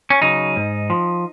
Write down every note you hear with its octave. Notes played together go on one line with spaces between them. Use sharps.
C#4
C#3 F#3 D#4
G#2
F3